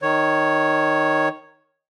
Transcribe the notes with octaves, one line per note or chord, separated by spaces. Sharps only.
D#3 C#5